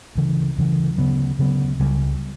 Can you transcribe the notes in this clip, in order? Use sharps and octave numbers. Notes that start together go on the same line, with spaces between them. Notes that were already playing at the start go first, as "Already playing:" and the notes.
D2 C#3 E3
D2 C#3 E3
D2 C#3 F#3 B3
D2 C#3 F#3 B3
C#2 C#3 G3